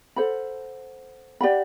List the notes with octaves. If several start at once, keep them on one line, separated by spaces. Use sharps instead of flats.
A4 C5 F#5 B5
G4 D5 F#5 B5